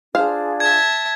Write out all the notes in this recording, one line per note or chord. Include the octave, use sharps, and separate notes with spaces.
D4 F4 G#4 C5 F5
E5 A5 G#6